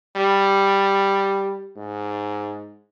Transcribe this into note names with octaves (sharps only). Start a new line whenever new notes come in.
G3
G#2